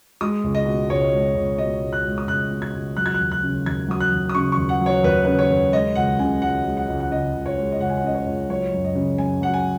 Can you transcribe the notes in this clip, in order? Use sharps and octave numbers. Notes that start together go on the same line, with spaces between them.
G#3 D#6
C#2
D#5
B2
C#2 C#5
G#3
C#2
B2 D#5
C#2
F#6
G#3
D#6
C#2 F#6
B2
G#6
C#2
F#3 F#6
G#6
F#6
D#2
F#6
C#3
D#2 G#6
F#3 D#6
F#6
D#2
D#6
C#3 C#6
C#6
D#2
F#5
F#3
C#5
D#2 B4
C#3 B4
C#5
D#2
G#3 D#5
C#2 F#5
C#3 G#5
C#2 F#5
G#3
F#5
C#2
F#5
C#3 D#5
C#2
C#5
G#3
D#5
C#2 F#5
G#5
F#5
C#3 D#5
C#5
C#2
F#3 C#5
F#2
D#5
C#3
F#2 G#5
F#3 F#5
G#5